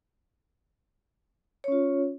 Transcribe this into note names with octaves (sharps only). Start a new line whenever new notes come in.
C#4 F4 C#5